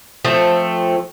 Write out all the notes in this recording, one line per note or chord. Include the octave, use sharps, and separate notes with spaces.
F3 A3 C4